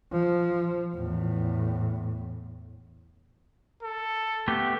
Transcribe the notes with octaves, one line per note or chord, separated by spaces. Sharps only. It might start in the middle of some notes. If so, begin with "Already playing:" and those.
F3
E2 A2
A4
A3 B3 G4